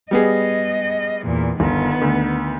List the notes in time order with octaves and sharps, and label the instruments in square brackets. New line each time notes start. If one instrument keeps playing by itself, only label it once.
[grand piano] G3 B3 G#4 [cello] D#5
[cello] E2 A#2
[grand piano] G1 [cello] D#3 B3
[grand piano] D2